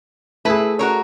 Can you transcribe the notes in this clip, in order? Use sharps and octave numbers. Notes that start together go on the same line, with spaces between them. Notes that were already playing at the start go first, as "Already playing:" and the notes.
A3 E4 G#4 B4
F#4 A#4 C#5